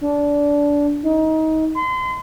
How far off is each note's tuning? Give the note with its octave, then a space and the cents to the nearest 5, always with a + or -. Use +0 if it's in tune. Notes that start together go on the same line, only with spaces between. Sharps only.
D4 -20
D#4 +25
C6 -35